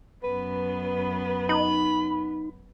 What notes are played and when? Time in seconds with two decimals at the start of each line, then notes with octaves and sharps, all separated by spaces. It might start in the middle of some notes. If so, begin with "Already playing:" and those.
0.24 F#2 B3 B4
1.49 D#4 B5